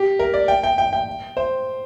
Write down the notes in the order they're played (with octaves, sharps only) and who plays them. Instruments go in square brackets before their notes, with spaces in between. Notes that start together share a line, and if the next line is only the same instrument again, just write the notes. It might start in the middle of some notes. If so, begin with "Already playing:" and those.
Already playing: [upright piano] G4
A#4
D5
G5
G5
G5
G5
C5